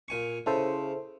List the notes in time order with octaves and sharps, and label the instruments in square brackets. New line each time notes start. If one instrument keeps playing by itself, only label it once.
[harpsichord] A#2 G#5 C#6
[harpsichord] C#3 [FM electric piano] E4 A4 C5